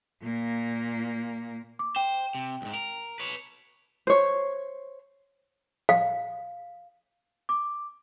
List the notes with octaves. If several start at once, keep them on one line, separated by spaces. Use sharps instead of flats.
A#2 A#3
D6
C5 G5
C3
C#2 G#2
A#4
B4 C#5
C5 C#5
F5
D6